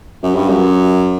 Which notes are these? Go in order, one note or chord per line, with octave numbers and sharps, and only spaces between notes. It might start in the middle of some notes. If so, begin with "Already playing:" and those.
F#2
G2
F#2